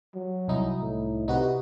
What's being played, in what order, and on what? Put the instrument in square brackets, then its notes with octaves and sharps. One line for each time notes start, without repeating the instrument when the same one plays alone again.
[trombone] F#3
[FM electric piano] C2 D#4 E4
[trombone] A2
[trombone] C3 [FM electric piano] D#4 F#4 B4